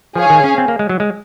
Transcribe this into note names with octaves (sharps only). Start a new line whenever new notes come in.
F3 G#4 C#5 F5 G#5
D#3
C#4
C4
A#3
G#3
F#3
G#3